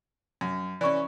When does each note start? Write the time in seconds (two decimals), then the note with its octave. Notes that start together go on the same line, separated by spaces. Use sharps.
0.41 F#2
0.81 E3 C#4 D5 C#6